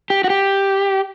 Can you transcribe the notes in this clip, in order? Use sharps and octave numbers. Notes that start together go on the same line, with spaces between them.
G4
F#4
G4